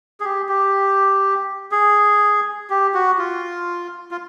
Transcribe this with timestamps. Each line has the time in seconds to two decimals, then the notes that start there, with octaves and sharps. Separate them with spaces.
0.20 G#4
0.24 G4
0.49 G4
1.72 G#4
2.70 G4
2.94 F#4
3.19 F4
4.11 F4